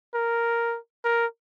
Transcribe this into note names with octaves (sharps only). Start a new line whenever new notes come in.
A#4
A#4